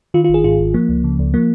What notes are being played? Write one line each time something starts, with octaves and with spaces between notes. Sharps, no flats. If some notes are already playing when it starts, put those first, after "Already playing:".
D#3 F4
F4
G#1
G#4
G#2 F4
G#1
F3 A#3
C#2
C#3
C#2
F3 A#3